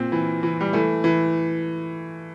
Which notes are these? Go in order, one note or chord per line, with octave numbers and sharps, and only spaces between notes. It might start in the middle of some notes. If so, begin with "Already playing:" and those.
Already playing: A#2 C4
E3
E3
G3
E3 A3
E3